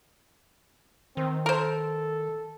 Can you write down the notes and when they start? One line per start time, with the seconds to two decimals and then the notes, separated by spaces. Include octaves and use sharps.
1.17 D#3 C4
1.46 A4 A#4 C5